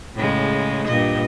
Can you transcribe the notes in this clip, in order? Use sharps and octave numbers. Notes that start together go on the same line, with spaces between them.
A2 C#3 G#3
G2 A#2 D#5